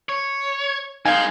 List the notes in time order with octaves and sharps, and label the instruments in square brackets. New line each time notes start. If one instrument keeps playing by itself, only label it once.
[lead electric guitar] C#5
[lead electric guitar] C2 G#3 [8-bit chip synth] D#4 G6 [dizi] F5 [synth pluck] G#5 G#6